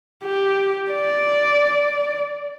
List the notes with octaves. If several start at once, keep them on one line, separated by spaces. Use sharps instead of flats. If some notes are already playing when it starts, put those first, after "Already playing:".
G4
D5